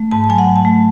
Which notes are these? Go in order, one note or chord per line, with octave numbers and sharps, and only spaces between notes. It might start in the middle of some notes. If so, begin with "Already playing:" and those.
Already playing: A3
G#2 A5
A5
F#3 G#5
F#5
G#2
A5
A3